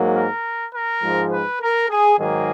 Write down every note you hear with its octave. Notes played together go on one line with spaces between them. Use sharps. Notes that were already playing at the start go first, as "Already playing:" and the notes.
Already playing: G#2 F#3 A#3
A#4
A#4
G#2 F3 G#3
B4
A#4
G#4
G#2 D#3 F#3 A#3 G#4